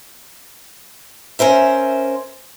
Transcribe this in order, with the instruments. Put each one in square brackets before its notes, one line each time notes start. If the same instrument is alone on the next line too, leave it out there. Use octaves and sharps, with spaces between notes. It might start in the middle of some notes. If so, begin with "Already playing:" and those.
[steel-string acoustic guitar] C#4 A#4 C5 E5